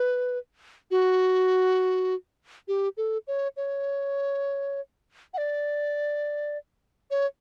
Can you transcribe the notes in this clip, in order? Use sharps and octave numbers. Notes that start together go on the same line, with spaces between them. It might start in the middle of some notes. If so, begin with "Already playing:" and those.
Already playing: B4
F#4
G4
A4
C#5
C#5
F#5
D5
C#5